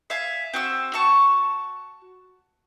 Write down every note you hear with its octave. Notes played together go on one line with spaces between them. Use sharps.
E5 F5 G#5
C4 F#4 E6
F#4 A5 C#6